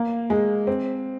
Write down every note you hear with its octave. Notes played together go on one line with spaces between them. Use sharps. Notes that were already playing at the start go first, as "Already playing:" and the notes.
Already playing: A#3
G#3
C4